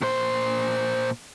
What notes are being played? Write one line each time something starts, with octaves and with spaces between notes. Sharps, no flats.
A#2 C5